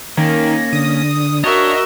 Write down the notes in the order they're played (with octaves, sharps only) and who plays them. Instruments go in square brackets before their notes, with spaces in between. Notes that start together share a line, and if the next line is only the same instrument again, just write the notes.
[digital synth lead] D#3 [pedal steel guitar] A#3 C#4 [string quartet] A#6
[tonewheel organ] D3 [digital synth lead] D#6
[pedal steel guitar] D4 C#5 [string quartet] F#4 A#4 E5 [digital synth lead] D#5